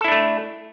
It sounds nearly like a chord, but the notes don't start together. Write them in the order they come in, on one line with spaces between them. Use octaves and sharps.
A4 E4 D4 A3